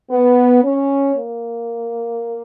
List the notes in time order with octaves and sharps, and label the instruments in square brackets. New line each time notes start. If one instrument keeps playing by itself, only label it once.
[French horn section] B3
C#4
A#3